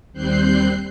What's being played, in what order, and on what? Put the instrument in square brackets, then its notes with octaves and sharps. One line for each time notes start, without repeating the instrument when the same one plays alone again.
[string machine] D#2 G3 C4 F#6 G6 C7